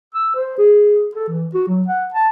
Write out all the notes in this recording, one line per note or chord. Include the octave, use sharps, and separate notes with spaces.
E6
C5
G#4
A4
E3
F#4
F#3
F#5
A5